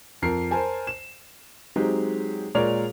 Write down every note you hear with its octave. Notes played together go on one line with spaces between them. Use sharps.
F2 A#4 C7
A#4 C5 G#5 A5
E7
F#3 G#3 C4 D#4 G4
A#2 G#3 A#4 C#5 D5 F7